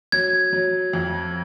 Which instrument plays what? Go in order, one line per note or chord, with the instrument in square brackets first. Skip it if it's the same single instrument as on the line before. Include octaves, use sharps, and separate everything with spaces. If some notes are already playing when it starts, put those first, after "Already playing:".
[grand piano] F#3 [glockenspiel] G#6
[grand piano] F#3
F2